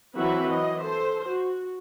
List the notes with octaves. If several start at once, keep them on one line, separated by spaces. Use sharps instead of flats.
E3 F#3 C4 F#4 B4 E5
E3 D#5
A4 C5
F#4